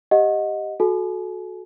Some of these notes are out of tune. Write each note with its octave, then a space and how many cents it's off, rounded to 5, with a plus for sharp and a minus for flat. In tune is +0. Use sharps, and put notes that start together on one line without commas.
G4 +0 D#5 +5 F#5 -20
F#4 -10 A4 -25 G#5 +40